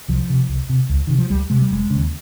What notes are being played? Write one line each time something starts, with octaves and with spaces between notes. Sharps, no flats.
C2 F3
C3
C2
C3
C#2
C3 D#3
F3
C#2 G3
C3 G#3
G3
F1 G#3
D#2 C#3